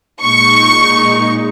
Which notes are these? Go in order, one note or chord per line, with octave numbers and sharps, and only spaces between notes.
A#2 G#3 D#4 C#6